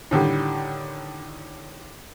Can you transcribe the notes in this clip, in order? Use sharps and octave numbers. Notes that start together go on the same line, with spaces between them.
A2 D3 D#3 G3